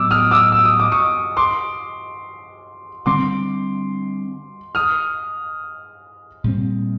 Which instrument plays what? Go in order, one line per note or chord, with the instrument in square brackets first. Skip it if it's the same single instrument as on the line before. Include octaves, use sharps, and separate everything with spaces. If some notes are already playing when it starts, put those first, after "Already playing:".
Already playing: [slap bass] A2 F#3 B3 [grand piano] D6 E6
[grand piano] D#6 F6
D6 E6
E6
D#6
D6
C#6 D#6
C6 D6
[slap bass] D3 G3 C4 [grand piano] C6 D6
[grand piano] D#6 F6
[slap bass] A#2 G3 C4